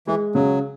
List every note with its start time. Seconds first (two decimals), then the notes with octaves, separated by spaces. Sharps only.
0.07 E3 G#3
0.35 C#3 F#3